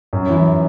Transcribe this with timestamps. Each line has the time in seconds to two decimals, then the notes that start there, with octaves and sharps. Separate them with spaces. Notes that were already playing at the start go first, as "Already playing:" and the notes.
0.13 F#2
0.29 E3